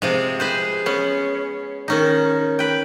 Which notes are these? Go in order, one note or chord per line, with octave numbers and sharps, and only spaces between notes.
C3 F3 G#3
G#4 B4 C5
B3 C#4
D#3 C#4 D#4
B4 G5